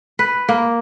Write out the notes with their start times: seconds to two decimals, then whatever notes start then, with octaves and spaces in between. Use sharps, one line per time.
0.19 B4
0.49 A#3